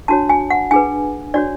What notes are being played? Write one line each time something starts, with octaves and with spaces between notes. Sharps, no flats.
D4 F#4 C#5 A5
G#5
F#5
D4 G#4 B4 G#5
D4 F#4 C#5 D5